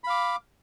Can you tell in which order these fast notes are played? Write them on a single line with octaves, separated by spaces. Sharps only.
B5 F5 D6